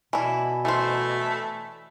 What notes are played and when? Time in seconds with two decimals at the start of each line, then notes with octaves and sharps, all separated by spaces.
0.13 B2 E3 E4 D5 G#5 A5
0.65 E3 A3 C5